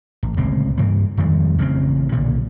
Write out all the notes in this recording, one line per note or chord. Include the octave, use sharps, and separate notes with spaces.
A1
D1 C#2 A#2 C4
G2 E3 A#3
F2 D#3 G3 G#3
A1 C#3 G3 C4
B1 A#2 D3